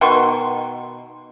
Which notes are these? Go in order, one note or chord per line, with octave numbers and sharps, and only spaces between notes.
B2 D#3 C6 C#6